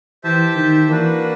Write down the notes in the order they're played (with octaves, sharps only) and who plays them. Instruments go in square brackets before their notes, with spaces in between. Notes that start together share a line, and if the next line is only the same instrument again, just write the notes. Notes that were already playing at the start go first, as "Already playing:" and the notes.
[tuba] E3 [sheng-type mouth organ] G4 C5 E5 A5
[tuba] D#3
[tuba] E3 [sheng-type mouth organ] A#3 D4 F#4 B4